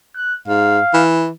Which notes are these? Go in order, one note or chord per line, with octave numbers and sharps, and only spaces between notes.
F#6
G#2 F5
E3